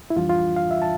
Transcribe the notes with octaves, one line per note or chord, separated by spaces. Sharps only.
E4
F2 E3 G3 D4 F4
F4
F5
E5
A5